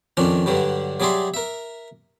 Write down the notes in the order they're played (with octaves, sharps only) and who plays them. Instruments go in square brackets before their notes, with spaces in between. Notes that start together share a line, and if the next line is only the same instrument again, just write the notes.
[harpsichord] F2 D#3 C#4 D4
G2 D3 F#3 G3
F#3 G3 G#4 D5 E5 C6
A#4 E5